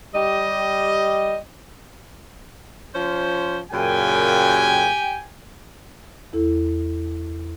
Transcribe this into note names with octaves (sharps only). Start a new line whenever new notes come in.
G3 G4 D#5
F3 C#4 C5
F#2 A#2 C#3 G4 G5 G#5
E2 E4 A4